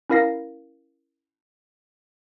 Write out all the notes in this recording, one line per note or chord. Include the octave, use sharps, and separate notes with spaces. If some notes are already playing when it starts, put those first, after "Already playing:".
C#4 E4 A#4 F5 A#6 C7